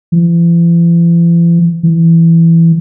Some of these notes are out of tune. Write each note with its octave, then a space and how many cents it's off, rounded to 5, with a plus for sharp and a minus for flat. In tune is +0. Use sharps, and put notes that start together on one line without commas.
E3 +45
E3 +10